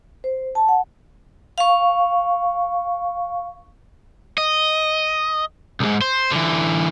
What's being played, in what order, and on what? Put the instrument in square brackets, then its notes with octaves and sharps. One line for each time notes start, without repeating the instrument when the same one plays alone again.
[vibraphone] C5
A5
F#5
F5 C#6
[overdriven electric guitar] D#5
C2 G#2
C5
D3 E3